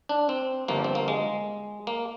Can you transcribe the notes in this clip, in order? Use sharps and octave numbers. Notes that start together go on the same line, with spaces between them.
D4
C4
G1 G2 F3 A#3
C4
A#3
G#3
A#3